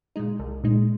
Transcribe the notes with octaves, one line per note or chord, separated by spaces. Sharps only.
A#2 G#3 D#4
C2
A#2 G#3 D#4